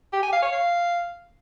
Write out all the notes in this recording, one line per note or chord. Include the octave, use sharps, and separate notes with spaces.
G4
G#5
F5
C#5
F5